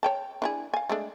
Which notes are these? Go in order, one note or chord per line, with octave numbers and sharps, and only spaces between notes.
C#5 G5 A5
D4 E4 G#4
F5 G#5
G#3 A3 D4